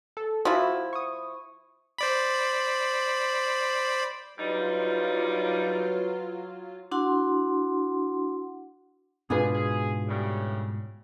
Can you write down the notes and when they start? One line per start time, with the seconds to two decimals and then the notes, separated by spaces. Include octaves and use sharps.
0.17 A4
0.45 F3 E4 F#4 E5
0.93 C#6 D#6
1.98 C5 D5 B5
4.39 F#3 G3 D4 D#4 F4 B4
6.91 D4 E4 F#4 F#5 C6
9.30 G#2 B2 D4 F4 G#4 B4
9.54 G#4
10.08 A2 C#3 G3